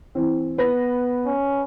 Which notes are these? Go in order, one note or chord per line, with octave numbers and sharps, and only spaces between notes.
E3 C4
B3 B4 A#6
C#4